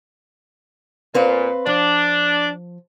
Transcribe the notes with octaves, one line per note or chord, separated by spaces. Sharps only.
A#2 C4 B4 F5
F3 D4